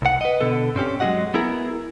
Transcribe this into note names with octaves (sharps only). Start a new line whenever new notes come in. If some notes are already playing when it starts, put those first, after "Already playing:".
C2 F#5
B4 D#5
B2 D3 B3 A4
G2 C4 C#4 G4
F#3 G#3 A#3 F#4 D#5 F#5
B3 E4 G#4 A#4